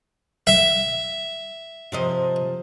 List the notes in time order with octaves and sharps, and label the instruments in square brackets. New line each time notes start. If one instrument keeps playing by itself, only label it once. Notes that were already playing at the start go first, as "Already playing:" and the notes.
[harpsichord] E5
[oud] C3 F3 D#5